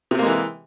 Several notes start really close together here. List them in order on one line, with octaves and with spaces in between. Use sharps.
C3 C4 A#3 G#3 E3